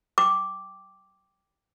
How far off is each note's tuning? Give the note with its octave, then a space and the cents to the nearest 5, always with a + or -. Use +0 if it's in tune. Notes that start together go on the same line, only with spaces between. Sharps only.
G5 +0 D6 +0